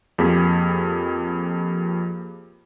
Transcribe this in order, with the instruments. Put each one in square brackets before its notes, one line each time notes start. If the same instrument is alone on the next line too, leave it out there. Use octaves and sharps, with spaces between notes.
[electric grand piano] F2 A#3 G4 G#4 B6